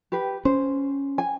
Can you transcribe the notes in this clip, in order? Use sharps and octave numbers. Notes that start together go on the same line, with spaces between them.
G4 B4
C#4 C5
G#5